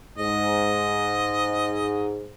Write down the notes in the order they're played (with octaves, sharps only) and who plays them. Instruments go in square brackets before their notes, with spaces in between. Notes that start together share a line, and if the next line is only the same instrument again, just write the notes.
[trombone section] G#2 [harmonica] D#5